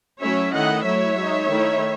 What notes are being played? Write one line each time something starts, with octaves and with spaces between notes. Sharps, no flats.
F#3 A3 C#4 E4 C#5 E5
D#3 A3 E4 D#5 F#5
F#3 A3 E4 C#5 E5
G#3 D#4
D#3 A3 E4